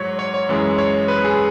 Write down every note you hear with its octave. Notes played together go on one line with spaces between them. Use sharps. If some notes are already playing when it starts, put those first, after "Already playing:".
Already playing: G#2 F#3 C#5
C#5
C#5
F#2 E3 G#3
C#5
B4
G#4